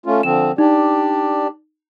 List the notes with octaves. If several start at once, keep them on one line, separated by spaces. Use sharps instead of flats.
A3 C#4 F4
D3 F3 C4 E7
D4 D#4 G4 D5